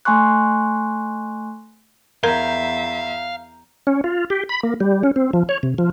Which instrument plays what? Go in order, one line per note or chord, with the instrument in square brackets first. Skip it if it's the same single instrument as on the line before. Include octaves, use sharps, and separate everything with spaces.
[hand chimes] A3 G#5 C6 C#6 F#6
[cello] E2 E5 [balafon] A#4 [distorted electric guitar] F5 [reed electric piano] A#5 G6
[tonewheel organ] C#4
F4
G4
B5
A#3
G3
C#4
C4
F3
C#5
C3
F3